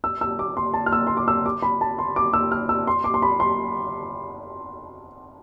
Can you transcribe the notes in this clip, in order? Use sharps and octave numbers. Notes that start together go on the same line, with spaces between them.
E6
E6
D6
C6
A5
F6
E6
C6
D6
E6
D6
B5
A5
C6
D6
E6
F6
E6
C6
D6
C6
B5
C6